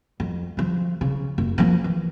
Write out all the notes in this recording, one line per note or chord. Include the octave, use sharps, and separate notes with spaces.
F2
D3 F3
C#3
F#1
F3 A#3
E3